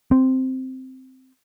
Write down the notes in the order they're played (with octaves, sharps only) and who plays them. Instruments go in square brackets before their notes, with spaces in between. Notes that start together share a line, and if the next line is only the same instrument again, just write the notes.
[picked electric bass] C4